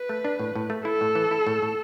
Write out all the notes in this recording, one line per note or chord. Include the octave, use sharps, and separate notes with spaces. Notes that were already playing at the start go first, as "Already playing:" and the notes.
Already playing: B4
A3
D4
A2
A2
A3
E4 A4
A2
E3
E4
A2
A2